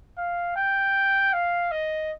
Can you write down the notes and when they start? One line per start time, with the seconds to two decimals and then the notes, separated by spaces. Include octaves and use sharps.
0.18 F5
0.56 G5
1.33 F5
1.72 D#5